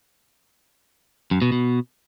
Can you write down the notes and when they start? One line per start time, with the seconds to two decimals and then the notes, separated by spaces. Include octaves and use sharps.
1.31 F#2
1.42 B2
1.52 B2